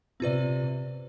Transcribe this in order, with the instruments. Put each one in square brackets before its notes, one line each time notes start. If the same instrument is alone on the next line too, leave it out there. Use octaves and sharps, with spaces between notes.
[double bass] C3 [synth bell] C4 F4 B4 D5